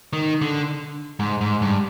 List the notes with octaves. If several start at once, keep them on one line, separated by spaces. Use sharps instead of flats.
D#3
D3
G#2
G#2
G2